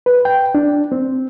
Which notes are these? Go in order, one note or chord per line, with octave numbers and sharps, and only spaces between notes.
B4
G5
D4
C4